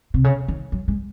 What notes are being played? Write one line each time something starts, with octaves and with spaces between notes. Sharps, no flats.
C3
C#3
D#3
F#3
G#3